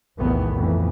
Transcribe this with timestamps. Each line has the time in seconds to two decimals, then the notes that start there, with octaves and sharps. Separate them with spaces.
0.18 F1 B1 E2 A2 D#3 B3
0.56 F2 A2 E3